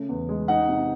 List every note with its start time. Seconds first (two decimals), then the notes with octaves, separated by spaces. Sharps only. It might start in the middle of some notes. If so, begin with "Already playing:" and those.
Already playing: C#3 A3
0.09 E2
0.29 G#3
0.48 D#4 F#5
0.69 C3